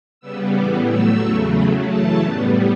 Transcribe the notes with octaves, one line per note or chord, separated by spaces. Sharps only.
C#3 G3 B3 E6
A2 E3 G3 B3 D6
A2 F#3 A3 E6
E2 C#3 F#3 A3 C#6
C#3 F#3 A3 B5
F#2 C#3 E3 A3 A5
A2 G3 B3